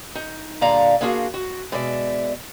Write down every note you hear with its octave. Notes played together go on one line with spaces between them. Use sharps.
D#4
A#2 D3 G3 D5 F5 A#5
A#3 D4 F4 F#4 G#4
F#4
B2 G#3 D5 E5